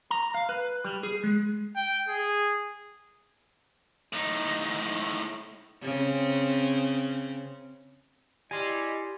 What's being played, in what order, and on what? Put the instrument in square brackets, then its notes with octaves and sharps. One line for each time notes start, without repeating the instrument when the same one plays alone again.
[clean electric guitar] A#5
F5
B4
G3
G#4
G#3
[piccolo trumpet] G5
G#4
[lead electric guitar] A2 D#4
[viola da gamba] C#3 C4
[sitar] G3 [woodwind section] E4 D5 D#5 [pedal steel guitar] G#5 C6